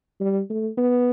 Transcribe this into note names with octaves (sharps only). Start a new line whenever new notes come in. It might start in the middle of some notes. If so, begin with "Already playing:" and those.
G3
A3
B3